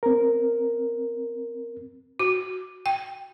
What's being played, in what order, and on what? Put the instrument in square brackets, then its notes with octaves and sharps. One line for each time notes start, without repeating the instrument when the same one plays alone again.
[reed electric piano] C4 A#4
[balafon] F#4
G5